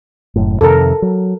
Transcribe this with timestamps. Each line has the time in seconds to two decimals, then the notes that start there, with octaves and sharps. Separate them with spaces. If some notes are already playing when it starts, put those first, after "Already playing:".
0.36 F#1 F#2 A2
0.61 F2 C3 D#3 A4 A#4
1.02 F#3